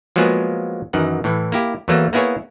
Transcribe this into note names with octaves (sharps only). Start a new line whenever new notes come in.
F3 F#3 G#3 A#3 B3 G#4
F#2 D#3 E3 F#5
A2 E3
A#3 E4 G4
E2 E3 F#3 A3 A#3
A#3 B3 E4 G#4 C#5